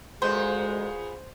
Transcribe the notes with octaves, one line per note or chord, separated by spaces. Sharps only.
D2 A#2 G#3 B3 G#4 C5